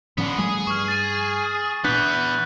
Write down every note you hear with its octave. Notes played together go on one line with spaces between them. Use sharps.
A2 D3 F3 B3 C#4
F3 G3 A3 G#4
G2 C#6 F6
A6 D#7
A#2 E3 B3 D4 F#6 G6 B6